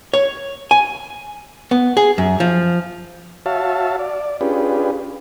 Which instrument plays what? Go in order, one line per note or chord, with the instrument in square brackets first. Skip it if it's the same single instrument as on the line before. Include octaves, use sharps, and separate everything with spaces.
[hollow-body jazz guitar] C#5
G#5
B3
G#4
F#2
F3
[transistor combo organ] F#4 C#5 E5 F5 A5
D5
C#4 D4 F4 G4 G#4 B4